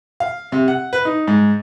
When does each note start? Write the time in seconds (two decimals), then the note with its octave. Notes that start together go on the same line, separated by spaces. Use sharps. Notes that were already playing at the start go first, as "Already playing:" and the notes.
0.20 F5
0.52 C3
0.68 F#5
0.93 B4
1.05 D#4
1.28 G#2